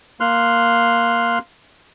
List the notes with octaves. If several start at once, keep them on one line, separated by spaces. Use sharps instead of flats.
A#3 C6 F6 F#6